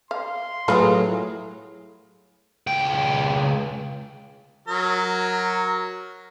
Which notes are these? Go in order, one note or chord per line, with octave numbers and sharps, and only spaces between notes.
F5 C6
A2 F#3 F4 G#4 A#4 B4
C#2 G5
F#3 A#4